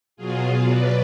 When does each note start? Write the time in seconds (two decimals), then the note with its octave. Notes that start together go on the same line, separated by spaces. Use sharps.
0.17 B2 F#3 F4 G#4
0.66 B4 D5